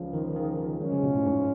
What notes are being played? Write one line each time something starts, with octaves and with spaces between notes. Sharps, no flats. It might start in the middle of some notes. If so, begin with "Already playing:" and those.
Already playing: C#2 C#3 F3
D#3
D#3
D#3
F3 F#3 G#3 C#4
C#3
B2
A2
G#2